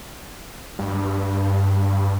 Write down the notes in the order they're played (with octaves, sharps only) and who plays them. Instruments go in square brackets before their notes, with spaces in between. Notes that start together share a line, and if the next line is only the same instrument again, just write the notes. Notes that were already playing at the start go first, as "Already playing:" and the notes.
[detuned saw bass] G2